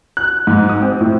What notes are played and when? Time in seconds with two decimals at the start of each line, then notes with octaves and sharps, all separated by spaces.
0.17 F#6
0.47 G#2
0.69 D#6
0.82 C4
1.01 A2